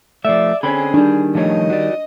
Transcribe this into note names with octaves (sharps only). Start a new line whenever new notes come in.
F3 A3 D5 E5
D3 C4 C#4 G#4 B5
D#3 G3 D4
F3 A3 C#5 D#5
F#4 D5